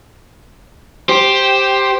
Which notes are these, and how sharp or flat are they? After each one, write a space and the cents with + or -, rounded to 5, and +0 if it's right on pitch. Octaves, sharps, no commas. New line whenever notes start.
G4 +0 C5 +5